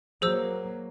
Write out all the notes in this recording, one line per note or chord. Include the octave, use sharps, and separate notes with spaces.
F#3 A#3 G#4 C5 E6